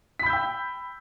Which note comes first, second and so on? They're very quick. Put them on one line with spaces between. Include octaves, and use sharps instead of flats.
B6 B5 G6 E6 G5